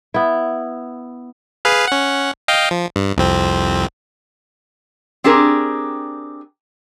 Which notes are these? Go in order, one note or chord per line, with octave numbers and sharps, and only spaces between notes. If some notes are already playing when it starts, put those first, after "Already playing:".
B3 E4
G#4 B4 F5
C#4 F#5
D#5 F5 G5
F3
G2
C2 F2 C4
C4 D4 G4 G#4 A#4